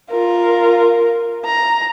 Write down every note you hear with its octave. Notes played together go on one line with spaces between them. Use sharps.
F4 A#4
A#5